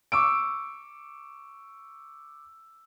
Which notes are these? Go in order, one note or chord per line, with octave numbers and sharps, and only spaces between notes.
C#6 D6 E6 D7